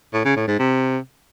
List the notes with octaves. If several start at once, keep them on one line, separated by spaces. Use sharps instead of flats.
A2
C#3
A2
G#2
C3